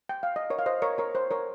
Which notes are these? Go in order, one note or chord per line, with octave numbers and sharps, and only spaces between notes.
G5
F5
D#5
A#4 C#5
F5
C5 D#5
A#4 C#5
A#4 C#5
C5
A#4 C#5